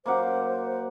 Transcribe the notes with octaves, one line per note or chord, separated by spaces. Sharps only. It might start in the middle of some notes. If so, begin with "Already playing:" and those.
F#2 A#3 C5 F#5 D6